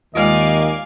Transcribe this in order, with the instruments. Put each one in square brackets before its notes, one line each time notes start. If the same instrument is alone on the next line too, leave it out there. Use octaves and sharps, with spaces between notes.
[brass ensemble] D#2 D#3 [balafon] G#3 F4 [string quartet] D5 F5 G#5 [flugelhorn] D#5